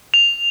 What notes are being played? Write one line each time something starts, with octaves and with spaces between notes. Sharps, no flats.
F7